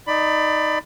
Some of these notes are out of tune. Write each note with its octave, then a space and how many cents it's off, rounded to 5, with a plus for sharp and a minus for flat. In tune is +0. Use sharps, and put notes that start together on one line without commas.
D#4 +0 D5 +15 B5 +20